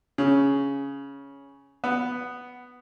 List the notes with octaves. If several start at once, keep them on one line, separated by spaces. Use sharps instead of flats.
C#3
B3